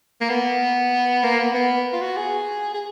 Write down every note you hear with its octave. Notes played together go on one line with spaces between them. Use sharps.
A#3
B3
A#3
B3
B3
F4
F#4
G#4
G#4